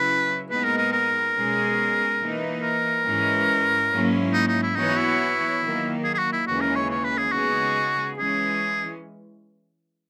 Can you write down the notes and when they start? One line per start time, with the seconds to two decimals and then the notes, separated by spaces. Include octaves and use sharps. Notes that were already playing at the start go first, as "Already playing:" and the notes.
Already playing: C#3 F#3 C#4 E4 B4
0.49 A#2 G#3 B3 D#4 B4
0.64 A#4
0.77 A#4
0.92 A#4
1.35 B2 G#3 C#4 G#4
2.20 E3 A#3 D#4
2.62 A#4
3.06 G#2 E3 G#3 C#4
3.91 G#2 F#3 A#3 C#4 E4
4.33 D#4
4.48 D#4
4.62 E4
4.76 E3 B3 D#4 F#4 C#5
4.98 E4
5.62 D#3 F#3 A#3
6.04 G#4
6.15 G#4
6.19 F#4
6.33 E4
6.47 D#2 C#3 E3 G#3 C#4 F#4
6.61 A#4
6.76 C#5
6.90 C#5
7.04 B4
7.18 G#4
7.32 C#3 G#3 B3 D#4 F#4 G#4
8.18 E3 G#3 C#4 G#4